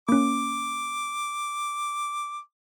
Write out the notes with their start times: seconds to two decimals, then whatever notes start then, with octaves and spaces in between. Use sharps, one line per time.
0.09 A#3 C#4 D6